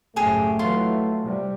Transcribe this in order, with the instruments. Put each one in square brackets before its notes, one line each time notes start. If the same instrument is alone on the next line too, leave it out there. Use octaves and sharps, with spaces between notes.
[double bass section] F#1 A2 [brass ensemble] A3 [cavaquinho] G4 G#4
[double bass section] E3 F#3 [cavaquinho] F4 C6
[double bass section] C3 G3